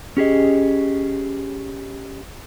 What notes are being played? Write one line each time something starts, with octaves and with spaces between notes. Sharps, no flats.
C#4 G4 G#4 D#5